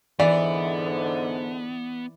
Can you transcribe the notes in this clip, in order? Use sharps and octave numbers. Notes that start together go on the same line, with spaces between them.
G#2 D3 E3 B3 D5